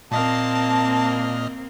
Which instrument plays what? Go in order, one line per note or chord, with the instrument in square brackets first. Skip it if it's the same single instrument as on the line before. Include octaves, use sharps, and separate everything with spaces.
[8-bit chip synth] A#2 D#5 F6 [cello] A#3 C4 [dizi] A5